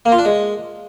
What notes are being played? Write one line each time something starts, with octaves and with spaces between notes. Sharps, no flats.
A#3
F4
D4
G#3